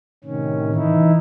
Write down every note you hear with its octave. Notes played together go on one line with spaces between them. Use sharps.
A2 C3 D#3 C#4
E3 D#4 E4